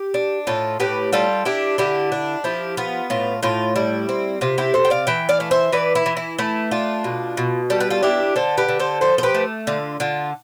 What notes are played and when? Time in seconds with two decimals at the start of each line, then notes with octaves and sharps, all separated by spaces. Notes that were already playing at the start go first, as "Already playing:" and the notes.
Already playing: G4
0.14 D4
0.47 A2 F4 A4
0.80 A2 G4 B4
1.12 G3 F4 A4
1.45 D4 E4 G4
1.78 D3 E4 G4
2.12 D4
2.44 F3 E4 G4
2.77 B3 F4
3.10 A2 F4
3.43 A2 F4
3.76 G3 E4
4.09 C4
4.41 C3 F4
4.58 E4 G4
4.74 C3 A4 C5
4.85 G5
4.90 D5 F5
5.07 E3 E5 G5
5.29 D5 F5
5.40 A3
5.51 C5 E5
5.73 E3 B4 D5
5.95 E4
6.06 E3
6.17 E4
6.39 A3 E4
6.71 D4 F4
7.04 B2
7.37 B2
7.70 G3 A4
7.80 B4
7.90 F4 A4
8.03 D4 E4 G4
8.36 D3 A4 C5
8.57 G4 B4
8.69 D3
8.79 A4 C5
9.01 F3 A4 C5
9.18 C5
9.23 G4 B4
9.34 A3
9.67 D3 F4
10.00 D3 F4